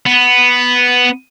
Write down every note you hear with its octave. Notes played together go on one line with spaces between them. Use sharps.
B3